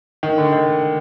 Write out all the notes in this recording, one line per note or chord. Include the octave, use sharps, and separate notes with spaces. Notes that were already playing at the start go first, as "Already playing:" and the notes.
D#3
D3
D#3